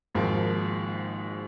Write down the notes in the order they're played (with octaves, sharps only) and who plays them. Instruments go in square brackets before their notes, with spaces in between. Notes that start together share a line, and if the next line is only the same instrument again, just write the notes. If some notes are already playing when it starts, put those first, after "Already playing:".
[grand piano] G#1 G#2 F3 A#3